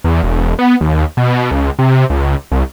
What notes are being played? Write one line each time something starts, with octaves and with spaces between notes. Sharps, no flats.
E2
E1
B3
D#2
B2
C#2
C3
C#2
C2